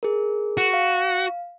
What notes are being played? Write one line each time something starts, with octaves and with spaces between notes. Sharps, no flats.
G#4 A#4
F#4
F5